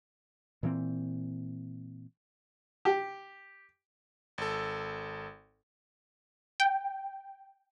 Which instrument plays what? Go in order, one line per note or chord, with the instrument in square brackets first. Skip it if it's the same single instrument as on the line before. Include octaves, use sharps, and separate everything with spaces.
[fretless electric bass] A#2 E3 C4
[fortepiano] G4
[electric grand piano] G#1 A4
[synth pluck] G5